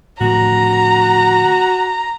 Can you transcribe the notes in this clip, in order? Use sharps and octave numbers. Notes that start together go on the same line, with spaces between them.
A2 D3 F3 F#4 A#5